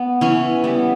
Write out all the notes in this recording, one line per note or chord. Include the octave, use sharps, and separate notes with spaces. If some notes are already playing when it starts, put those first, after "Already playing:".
Already playing: B3
E3 C#4
G3 B3